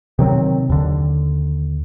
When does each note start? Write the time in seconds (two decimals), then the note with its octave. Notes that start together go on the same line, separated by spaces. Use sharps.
0.19 C3 D#3 F#3 C4
0.70 D#2 D3